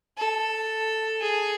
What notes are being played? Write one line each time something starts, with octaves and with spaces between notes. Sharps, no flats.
A4
G#4